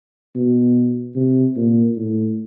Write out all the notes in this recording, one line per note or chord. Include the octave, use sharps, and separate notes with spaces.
B2
C3
A#2
A2